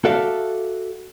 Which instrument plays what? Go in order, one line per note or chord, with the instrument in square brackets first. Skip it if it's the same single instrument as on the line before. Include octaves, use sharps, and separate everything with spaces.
[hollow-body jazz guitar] F#4 A4 D5 E5 F5